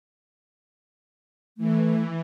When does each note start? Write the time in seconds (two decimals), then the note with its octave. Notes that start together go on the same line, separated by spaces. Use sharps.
1.58 E3 A3